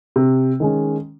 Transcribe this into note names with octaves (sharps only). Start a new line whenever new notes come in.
C3
D#3 G#3 C#4